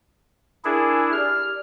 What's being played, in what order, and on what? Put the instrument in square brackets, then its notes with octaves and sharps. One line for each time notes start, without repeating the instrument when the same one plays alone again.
[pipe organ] D4 E4 G#4 [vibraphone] A#4 G#5
[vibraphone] G4 D5 [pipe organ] F6